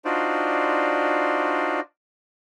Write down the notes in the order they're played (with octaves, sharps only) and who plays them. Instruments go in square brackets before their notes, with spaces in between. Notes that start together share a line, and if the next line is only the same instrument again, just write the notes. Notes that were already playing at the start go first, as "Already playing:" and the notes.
[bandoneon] D4 D#4 F4 F#4 C5 D5